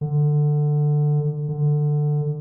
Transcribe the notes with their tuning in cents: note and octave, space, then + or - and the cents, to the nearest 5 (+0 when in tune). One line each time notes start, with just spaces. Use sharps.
D3 +15
D3 +15